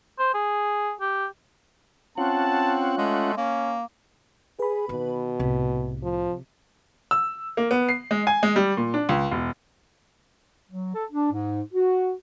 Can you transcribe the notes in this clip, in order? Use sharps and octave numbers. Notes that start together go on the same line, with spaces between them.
C5
G#4
G4
C4 C#4 F4 F#5 A5
G#3 A3
A#3 C#4
G#4 B4 B5
B2 D3 D#3
C2 A2 C3
F3
E6
A#3
B3
C7
G#3
G#5
G#3
G3
A#2
D4
C#2
E1
F#3
A4
D4
G#2
F#4